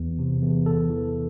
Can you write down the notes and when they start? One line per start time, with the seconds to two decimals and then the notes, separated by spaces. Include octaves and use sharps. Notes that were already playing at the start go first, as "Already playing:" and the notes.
Already playing: E2
0.19 C3
0.42 E2
0.66 A4
0.90 E3